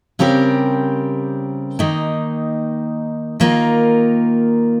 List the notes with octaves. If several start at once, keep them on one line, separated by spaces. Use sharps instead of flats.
C#3 G3 C4 G4 A#4
D#3 A#3 D#4
D#3 A#3 F4 A#4